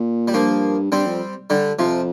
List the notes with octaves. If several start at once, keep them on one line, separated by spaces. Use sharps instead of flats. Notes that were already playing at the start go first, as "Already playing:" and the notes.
Already playing: A#2
G3
G2 F3 A#3
G2 G3 C4
F2
D3 G3
F2 C3 F3